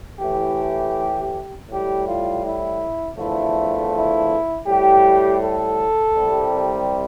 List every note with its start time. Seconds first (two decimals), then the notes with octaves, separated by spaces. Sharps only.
0.20 A2 E3 A3 G4
1.69 A2 G3 G4
2.06 F4
2.43 E4
3.18 E2 D3 F3 A3 E4
3.92 E4
4.66 A2 G3 G4
5.41 A4
6.15 C2 C3 G3